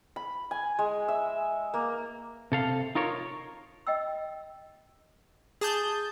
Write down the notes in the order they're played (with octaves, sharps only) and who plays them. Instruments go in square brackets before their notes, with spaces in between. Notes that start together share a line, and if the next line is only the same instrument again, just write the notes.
[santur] B5
G#5
G#3
E5
A#3
[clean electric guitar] C3 A4 F5
D#4 F4 A#4 C#5
[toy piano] D#5 G5 E6
[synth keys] G#4 A5 G6 [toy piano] D6